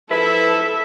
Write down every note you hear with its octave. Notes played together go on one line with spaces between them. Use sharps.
F3 E4 A4 B4 E5